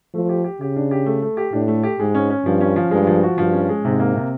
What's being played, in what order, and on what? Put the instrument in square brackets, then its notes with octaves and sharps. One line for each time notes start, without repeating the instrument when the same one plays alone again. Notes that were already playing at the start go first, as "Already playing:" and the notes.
[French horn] F3 [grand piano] A3
[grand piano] G4
G4
[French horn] C#3 [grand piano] G4
[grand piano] D4
G4
A3
A3
G4
[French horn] A2 [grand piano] D4
[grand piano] A3
G4
[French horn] G#2 [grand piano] G#3
[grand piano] C#4
C#4
[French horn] G2 [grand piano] F3
[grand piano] C#4
F3
[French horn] G2 [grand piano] G#3
[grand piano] F3
F#4
[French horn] G2 [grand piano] F3
[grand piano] C#4
G#3
[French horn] G#2 [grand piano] C3
[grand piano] A#3
C3